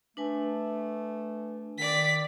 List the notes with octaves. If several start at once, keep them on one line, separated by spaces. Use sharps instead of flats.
A3 D4 B4 G#5
D#3 D5 B6